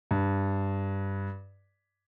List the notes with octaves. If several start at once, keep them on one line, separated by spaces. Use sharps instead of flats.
G2